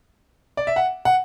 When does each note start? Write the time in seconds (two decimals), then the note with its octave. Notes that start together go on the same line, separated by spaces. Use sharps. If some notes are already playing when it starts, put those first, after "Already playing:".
0.57 D5
0.67 E5
0.76 F#5
1.05 F#5